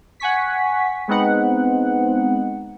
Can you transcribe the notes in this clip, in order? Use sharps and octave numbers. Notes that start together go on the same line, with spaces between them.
F#5 G#5 C#6 B6
G#3 B3 C4 D#4 F#5